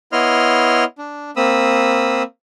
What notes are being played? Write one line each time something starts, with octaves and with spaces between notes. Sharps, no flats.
B3 E4 C#5 D#5 C6 F6
D4
A#3 C4 B5 D#6 E6